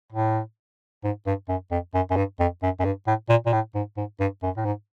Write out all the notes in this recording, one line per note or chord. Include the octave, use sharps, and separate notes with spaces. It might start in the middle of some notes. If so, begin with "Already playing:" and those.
A2
G#2
G2
F#2
F2
F#2
F#2
G2
F2
F#2
F#2
G2
A2
A#2
A#2
A2
G#2
G#2
G2
F#2
A2
G#2